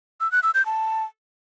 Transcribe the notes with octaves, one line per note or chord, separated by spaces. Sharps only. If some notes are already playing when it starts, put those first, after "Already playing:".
E6
F#6
E6
G6
A5